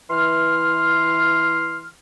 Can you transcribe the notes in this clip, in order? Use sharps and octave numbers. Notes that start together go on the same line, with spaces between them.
E3 C6 F6